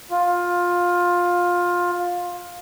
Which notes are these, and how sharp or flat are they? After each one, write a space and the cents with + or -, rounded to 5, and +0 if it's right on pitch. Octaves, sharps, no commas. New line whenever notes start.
F4 +15